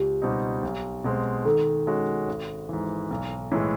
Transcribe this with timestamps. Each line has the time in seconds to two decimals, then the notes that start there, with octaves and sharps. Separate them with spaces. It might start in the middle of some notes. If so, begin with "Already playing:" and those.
Already playing: C#2 G4
0.22 B2 G3 C4 D#4
0.63 B1
1.04 B2 G#3 C4
1.45 D#3 A4
1.87 G#3 C#4 F#4
2.28 G#1
2.69 G#2 E3
3.11 B1
3.52 A2 E3 G#3